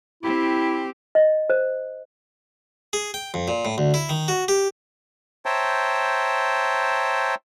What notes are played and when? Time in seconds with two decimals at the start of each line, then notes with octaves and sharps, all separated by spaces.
0.23 C4 E4 G4
1.15 D#5
1.50 C5
2.93 G#4
3.14 G5
3.34 F2
3.48 A#2
3.65 A2
3.78 D2
3.94 E4
4.09 D#3
4.28 F#4
4.48 G4
5.46 C5 C#5 E5 G5 A5 A#5